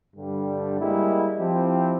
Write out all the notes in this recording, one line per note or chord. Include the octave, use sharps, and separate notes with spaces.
G2 D3 G3
G3 G#3 A#3 E4
F3 C4 E4 G4